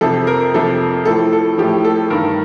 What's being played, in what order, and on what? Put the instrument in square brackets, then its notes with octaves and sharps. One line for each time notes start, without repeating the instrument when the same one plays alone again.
[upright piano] F2 C3 F3 A4
A#4
F2 C3 F3 A4
A2 F3 A4
A4
A2 F3 G4
A4
G2 D#3 A#4